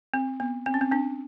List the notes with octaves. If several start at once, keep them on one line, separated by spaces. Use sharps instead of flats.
C4
B3
C4
C#4
C4
C4 D4